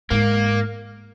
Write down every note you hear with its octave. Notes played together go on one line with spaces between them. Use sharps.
G#2 A#3